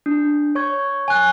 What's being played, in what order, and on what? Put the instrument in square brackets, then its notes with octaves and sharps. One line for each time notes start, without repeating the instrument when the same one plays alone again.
[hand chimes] D4
C#5 C#6 G#6
[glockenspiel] G#5 F#6